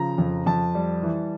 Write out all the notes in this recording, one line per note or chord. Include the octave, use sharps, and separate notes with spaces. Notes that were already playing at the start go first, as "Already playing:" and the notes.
Already playing: C#3 F3 A#5
F2
F2 A5
G3
E3